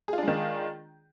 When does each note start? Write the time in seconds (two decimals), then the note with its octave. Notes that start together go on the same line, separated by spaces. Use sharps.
0.08 G#4
0.13 F4
0.18 D4
0.23 G#3
0.28 D#3